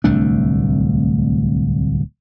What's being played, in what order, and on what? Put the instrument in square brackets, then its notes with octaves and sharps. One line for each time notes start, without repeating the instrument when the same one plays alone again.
[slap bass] D1 C2 A3 D4